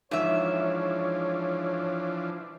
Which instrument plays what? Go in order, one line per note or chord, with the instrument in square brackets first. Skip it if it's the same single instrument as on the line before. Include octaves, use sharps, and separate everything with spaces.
[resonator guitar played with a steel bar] G#2 E5 [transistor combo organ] E3 F3 D4 [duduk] C#5